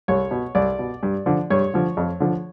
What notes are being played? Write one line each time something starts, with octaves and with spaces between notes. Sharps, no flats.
C2 C#5
B2
C2 D5
B2
G2
D3 F3
G2 C#5
D3 F3
F2
D3 F3